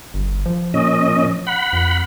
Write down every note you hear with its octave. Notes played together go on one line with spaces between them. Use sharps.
G1
F3
A#2 C#4 D#5
F#5 B5
F2